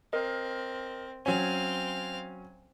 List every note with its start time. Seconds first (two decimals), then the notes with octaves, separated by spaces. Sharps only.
0.13 C4 A#4 D#5
1.26 F#3 C4 C#4 F5 G#5